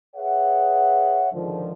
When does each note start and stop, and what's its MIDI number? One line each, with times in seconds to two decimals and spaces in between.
0.16 1.28 68
0.16 1.28 71
0.16 1.28 73
0.16 1.28 76
0.16 1.28 78
1.33 1.73 37
1.33 1.73 44
1.33 1.73 50
1.33 1.73 51
1.33 1.73 53